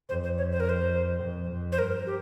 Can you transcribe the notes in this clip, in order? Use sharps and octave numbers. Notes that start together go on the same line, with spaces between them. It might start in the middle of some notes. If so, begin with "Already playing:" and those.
F2 C5
C5
C#5
C5
A#4
C5
F2
F2
C5
G2 A#4
G4